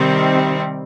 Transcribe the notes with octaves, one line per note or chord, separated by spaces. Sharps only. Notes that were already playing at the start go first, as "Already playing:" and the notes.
Already playing: C3 D#3 G3 C4